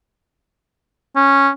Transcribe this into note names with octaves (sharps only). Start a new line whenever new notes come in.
C#4